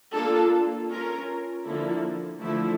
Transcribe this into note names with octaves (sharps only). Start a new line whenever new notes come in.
A#3 D4 F4 A4
C#4 F4 A#4
D3 F3 A#3 E4 A4
D3 F3 A3 E4 A4